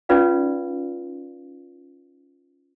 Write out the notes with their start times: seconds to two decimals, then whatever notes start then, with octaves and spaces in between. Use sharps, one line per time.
0.09 C#4 D#4 F4 B4 D5 F5